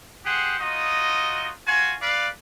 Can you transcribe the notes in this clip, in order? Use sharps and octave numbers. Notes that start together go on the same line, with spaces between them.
G4 G#4 C5 F#5
D#4 F4 F#4 D#5
F4 F#4 G#5
B4 D5 F5